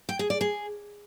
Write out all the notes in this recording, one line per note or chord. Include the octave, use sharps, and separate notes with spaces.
G5
G#4
D5
G#4